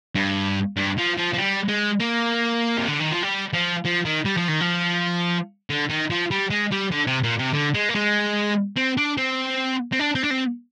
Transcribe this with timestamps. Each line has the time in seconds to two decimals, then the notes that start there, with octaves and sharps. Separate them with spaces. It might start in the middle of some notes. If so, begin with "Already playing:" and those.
0.15 G2
0.77 G2
0.98 F3
1.18 F3
1.34 F3
1.38 G3
1.69 G#3
2.00 A#3
2.77 C3
2.88 D3
3.00 D#3
3.11 F3
3.23 G3
3.53 F3
3.85 F3
4.05 D#3
4.25 G3
4.37 F3
4.48 D#3
4.60 F3
5.70 D3
5.90 D#3
6.10 F3
6.31 G3
6.51 G#3
6.72 G3
6.92 D3
7.07 C3
7.23 A#2
7.39 C3
7.53 D3
7.75 G#3
7.89 A#3
7.95 G#3
8.76 C4
8.97 D4
9.18 C4
9.93 C4
9.99 D4
10.15 C4
10.24 D4
10.31 C4